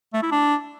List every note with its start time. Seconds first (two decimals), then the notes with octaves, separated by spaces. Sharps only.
0.13 A3
0.22 E4
0.31 D4